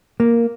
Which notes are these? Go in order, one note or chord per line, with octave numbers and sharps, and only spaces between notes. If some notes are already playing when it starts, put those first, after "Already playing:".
A#3